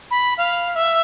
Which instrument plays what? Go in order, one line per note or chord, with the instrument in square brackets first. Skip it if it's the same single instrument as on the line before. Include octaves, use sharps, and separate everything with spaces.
[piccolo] B5
F5
E5